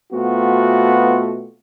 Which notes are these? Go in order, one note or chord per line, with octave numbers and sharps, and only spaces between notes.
B2 A3 B3 C4 F4 F#4